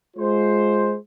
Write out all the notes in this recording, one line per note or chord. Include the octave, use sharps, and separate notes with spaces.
G#3 F4 C5